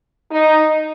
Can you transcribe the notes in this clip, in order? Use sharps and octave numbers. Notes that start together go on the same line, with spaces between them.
D#4